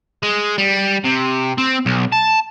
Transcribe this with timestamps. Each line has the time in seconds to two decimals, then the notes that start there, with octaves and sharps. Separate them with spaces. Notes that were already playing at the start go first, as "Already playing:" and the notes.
0.23 G#3
0.58 G3
1.04 C3
1.58 C4
1.86 B1
2.12 A5